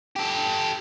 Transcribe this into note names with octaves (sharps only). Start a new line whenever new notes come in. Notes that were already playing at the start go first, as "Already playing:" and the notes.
G4 A4